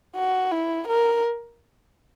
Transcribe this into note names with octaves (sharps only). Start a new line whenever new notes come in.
F#4
E4
A#4